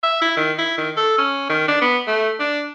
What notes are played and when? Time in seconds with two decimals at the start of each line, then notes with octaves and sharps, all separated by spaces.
0.03 E5
0.22 E4
0.37 D#3
0.59 E4
0.78 D#3
0.97 A4
1.18 C#4
1.49 D#3
1.68 D4
1.82 B3
2.07 A3
2.40 D4